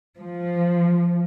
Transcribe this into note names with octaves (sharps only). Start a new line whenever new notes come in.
F3